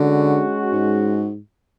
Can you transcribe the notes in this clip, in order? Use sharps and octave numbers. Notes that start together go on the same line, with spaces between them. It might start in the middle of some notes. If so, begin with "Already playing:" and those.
Already playing: D3 G#3 C#4 F#4
G#2